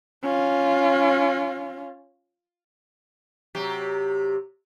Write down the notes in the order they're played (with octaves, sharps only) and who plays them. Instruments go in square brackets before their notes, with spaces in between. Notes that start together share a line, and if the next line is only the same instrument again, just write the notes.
[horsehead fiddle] C#4 F4
[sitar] C3 F#3 G4